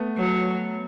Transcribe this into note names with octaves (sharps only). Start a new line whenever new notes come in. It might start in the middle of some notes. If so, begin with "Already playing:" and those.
Already playing: A3 B3
F#3